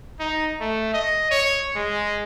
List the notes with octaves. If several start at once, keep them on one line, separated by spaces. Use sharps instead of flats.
D#4
A3
D#5
C#5
G#3